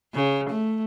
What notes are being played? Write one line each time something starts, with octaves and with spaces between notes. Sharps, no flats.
C#3
A3